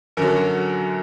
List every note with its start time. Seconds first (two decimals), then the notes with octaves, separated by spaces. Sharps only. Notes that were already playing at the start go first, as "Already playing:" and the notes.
0.17 F#2 D3 F#3 A#4
0.27 A4
0.36 F#4